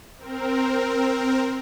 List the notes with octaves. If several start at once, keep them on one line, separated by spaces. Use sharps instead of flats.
C4 A#4